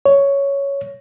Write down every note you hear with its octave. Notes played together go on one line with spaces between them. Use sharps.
C#5